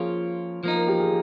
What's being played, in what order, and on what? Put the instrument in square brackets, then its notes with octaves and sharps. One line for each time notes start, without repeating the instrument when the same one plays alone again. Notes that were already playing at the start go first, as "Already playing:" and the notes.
Already playing: [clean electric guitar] F3 A#3 C#4 F4 [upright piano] G#4
[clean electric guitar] F3 A#3 D#4
[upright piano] A#4
G4
G#4